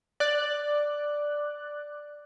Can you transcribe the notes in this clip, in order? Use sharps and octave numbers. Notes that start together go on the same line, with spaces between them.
D5 F#6